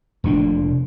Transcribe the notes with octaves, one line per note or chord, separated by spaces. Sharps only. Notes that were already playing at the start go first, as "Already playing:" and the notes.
F1 A#2 D4